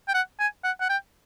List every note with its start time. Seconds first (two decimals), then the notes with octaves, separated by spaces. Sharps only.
0.08 G5
0.14 F#5
0.40 G#5
0.64 F#5
0.80 F#5
0.89 G5